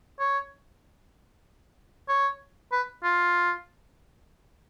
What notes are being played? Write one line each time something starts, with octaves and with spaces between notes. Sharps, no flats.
C#5
C#5
B4
F4